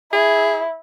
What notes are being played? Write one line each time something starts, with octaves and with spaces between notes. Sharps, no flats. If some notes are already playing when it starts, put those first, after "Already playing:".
E4 G#4